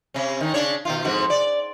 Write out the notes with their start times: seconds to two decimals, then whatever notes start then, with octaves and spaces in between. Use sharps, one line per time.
0.14 C3 C#4
0.41 D#3 D#4
0.54 C#3 D4 C#5
0.85 B2 D#3 F4
1.04 F2 G#2 F#4
1.30 D5